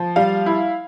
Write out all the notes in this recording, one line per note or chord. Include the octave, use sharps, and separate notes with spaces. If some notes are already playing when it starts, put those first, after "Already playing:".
Already playing: F3
G3 F5
E4